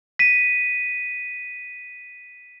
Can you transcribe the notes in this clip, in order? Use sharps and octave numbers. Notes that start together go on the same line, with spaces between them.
B6 D#7